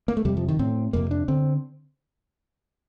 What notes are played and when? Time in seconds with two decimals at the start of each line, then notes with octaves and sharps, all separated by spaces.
0.08 A#3
0.17 A3
0.25 F2 C3 G3
0.37 F3
0.48 D#3
0.59 A2 C4
0.93 F2 C3 A#3
1.11 D4
1.28 D3 C4